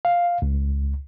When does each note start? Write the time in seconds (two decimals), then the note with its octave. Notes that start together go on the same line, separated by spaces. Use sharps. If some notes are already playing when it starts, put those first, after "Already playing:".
0.05 F5
0.42 C#2